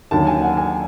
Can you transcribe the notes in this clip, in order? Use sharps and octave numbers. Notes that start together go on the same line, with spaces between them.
D#2 D3 F#3 A5
G#5
F#5
G#5